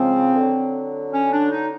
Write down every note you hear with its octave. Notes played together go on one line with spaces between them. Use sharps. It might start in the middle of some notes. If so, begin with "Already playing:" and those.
Already playing: C#3 F3 G#3 C4
D3 F#3
C#4
D4
D#4